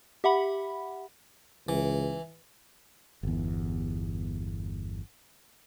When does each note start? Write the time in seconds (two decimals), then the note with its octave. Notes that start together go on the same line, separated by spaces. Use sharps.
0.24 G4 E5 F#5 B5
1.69 C#2 E3
3.23 G1 E2